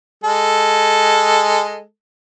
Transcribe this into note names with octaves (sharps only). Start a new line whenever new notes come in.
G#3 A4